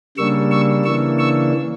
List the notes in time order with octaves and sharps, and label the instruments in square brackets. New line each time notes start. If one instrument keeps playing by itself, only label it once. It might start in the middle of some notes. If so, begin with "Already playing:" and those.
[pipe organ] C#3 G3 A#3 D4 C#6 E6
C#6 E6
C#3 E3 A#3 D4 C#6 E6
C#6 E6